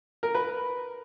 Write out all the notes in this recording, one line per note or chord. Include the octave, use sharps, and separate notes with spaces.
A#4
B4